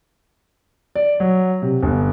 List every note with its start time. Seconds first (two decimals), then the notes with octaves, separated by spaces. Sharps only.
0.95 D5
1.20 F#3
1.62 C3
1.83 G1